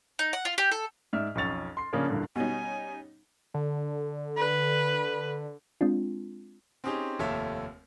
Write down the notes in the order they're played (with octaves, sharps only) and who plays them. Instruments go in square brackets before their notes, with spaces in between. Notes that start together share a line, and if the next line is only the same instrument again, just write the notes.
[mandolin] D#4
F#5
F4
G4
A4
[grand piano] G#2 D5 E5 F6
B1 F2 C#4 C#6 A6 F7
C6 C7
C#3 F3 A#3 C#4 D4
E2 G2 A#2 D3
[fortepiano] B2 [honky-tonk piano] G3 C#4 D#4 [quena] G#5
[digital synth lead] D3
[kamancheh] B4
[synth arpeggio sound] G#3 C4 D4 F4
[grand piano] C4 C#4 D#4 G4 G#4
F1 D#2 A4 C#5 E5 F5